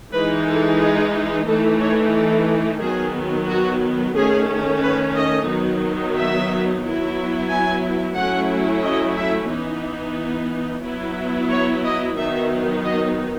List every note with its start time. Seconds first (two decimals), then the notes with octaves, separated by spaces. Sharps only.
0.12 E3 G#3 D#4 B4
0.46 A4
0.80 G#4
1.47 E3 A3 D#4 A4
1.80 C#5
2.14 A4
2.81 D#3 F#3 B3 G#4
3.47 F#4
4.15 D#3 A3 C#4 G#4
4.82 B4
5.16 D#5
5.48 D#3 F#3 B3 D#4
6.15 E5
6.83 F#3 B3 E4
7.49 G#5
8.16 F#3 A3 C#4 E4 F#5
8.83 D#5
9.17 E5
9.50 E3 B3 D#4
10.84 F#3 B3 E4
11.50 C#5
11.84 D#5
12.17 D#3 F#3 B3 D#4 E5
12.84 D#5